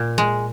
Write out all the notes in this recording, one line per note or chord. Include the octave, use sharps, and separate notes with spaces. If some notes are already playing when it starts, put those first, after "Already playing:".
Already playing: A#2
G#3